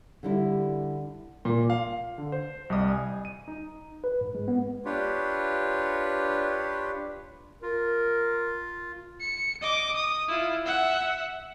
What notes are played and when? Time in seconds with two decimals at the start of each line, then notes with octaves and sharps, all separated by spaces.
0.23 D3 G3 E4
1.45 A#2
1.70 F5
2.18 D3
2.32 C5
2.70 C2 G3 D#5 D#6
2.92 G#5
3.25 D#7
3.48 D#4
4.04 B4
4.21 G#2
4.35 G#3
4.48 B3
4.85 D4 F4 G4 B4 C#5
7.62 F4 A#4
9.21 C#7
9.62 D#5 D6
9.96 D#6
10.28 E4 F4
10.66 E5 F#5